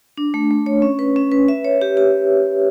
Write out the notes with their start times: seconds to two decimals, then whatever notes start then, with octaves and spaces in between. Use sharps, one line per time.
0.17 D4
0.34 A3
0.51 A3
0.66 C#5
0.82 C#4
0.99 B4
1.16 C#4
1.32 B4
1.48 E5
1.64 C#5
1.82 G4
1.97 G4